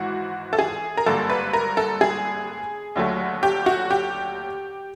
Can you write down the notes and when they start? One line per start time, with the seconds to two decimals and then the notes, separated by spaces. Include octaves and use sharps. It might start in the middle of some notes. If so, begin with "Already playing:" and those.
Already playing: G#1 G#2 E3 F#4
0.53 A4
0.59 G#4
0.97 A#4
1.06 G#1 G2 D3 G3 A#3 A4
1.30 B4
1.53 A#4
1.77 A4
2.01 G#4
2.96 D#2 D3 F#3 A3
3.43 G4
3.66 F#4
3.91 G4